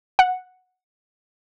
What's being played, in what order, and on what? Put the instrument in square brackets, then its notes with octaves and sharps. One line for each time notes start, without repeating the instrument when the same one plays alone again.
[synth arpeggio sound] F#5